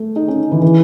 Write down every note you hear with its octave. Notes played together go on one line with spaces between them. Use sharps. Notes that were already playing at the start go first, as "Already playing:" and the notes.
Already playing: A3
D#4
C#4
E3
E3